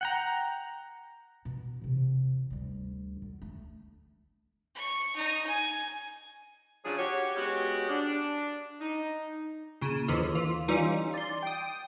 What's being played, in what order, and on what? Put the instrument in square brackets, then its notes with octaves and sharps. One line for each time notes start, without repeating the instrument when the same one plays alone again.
[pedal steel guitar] F#5 G5 A#5
[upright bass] B2
E2 C3
D2 G3
D3
A3
[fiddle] C#6
D#4
G#5
[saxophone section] C#3 F3 F#3 C#4 D4 G#4
F#4 G4 C#5
G#3 B3 C#4 F#4 G4
D4
D#4
[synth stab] A#2 C#3 D#7 E7
D#2 D3 E3 F3
E3 F4
E3 G3 C#4 D#4 F4
D5 C6
G5 D#6